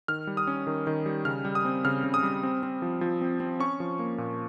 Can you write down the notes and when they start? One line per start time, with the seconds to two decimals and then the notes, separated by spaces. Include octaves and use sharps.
0.08 D#3 F6
0.27 G3
0.37 D#6
0.47 C#4
0.67 D#3
0.87 D#3
1.06 G3
1.25 C#3 F6
1.45 G3
1.55 D#6
1.65 C4
1.85 C#3 F6
2.04 C#3
2.14 D#6
2.23 G3
2.43 C4
2.63 C4
2.82 F3
3.01 F3
3.21 C4
3.40 C4
3.60 C#4 C#6
3.80 F3
3.99 A#3
4.18 A#2